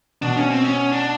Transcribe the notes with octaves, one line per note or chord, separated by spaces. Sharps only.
B2 D4
C#4
C4
C#4
D4